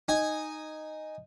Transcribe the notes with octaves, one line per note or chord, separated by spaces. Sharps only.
D#4 G#5